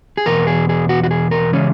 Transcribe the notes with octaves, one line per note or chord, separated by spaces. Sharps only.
G#4
E2 B2 A#4
G#4
G#4
F#4
F#4
G#4
A#4
C#3 E3 G#3 C#4